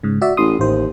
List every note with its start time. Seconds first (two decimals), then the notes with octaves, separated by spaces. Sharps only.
0.03 G#2 C#3
0.21 F#4 D5 E5
0.37 A1 C6 D#6
0.59 A1 D#2 C5